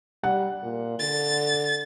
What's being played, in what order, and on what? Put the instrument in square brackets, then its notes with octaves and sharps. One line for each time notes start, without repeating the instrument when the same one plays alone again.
[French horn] G3 [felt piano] F#5
[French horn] A#2
[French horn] D3 [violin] A6